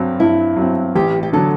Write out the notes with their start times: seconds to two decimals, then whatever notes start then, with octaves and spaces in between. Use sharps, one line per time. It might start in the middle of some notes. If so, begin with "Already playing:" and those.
Already playing: G2 F#3 C4
0.20 G2 E4
0.57 F#3 C4
0.95 A1 G4
1.23 G4
1.33 D3 F#3 A4